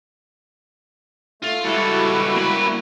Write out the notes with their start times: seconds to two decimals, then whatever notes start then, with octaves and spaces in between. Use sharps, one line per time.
1.42 A3 F4
1.64 C#2 G3 E4 F#4 A4
2.36 A#3 B5